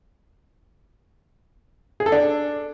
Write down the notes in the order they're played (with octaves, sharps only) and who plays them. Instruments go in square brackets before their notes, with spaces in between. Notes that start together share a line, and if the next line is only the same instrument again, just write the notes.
[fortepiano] G#4
A4
D4